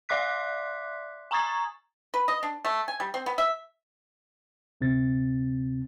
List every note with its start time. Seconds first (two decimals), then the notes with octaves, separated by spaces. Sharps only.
0.09 D5 E5 C6 D6 F#6 B6
1.31 G#5 A#5 C#6 D#6 G#6 A6
2.14 B4
2.28 D#5
2.43 D4
2.65 A3
2.88 G#5
3.00 G3
3.14 C4
3.26 B3
3.38 E5
4.81 D2 C3 C4 A6